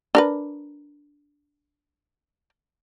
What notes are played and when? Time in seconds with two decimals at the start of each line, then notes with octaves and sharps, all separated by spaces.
0.15 D4 A#4 B4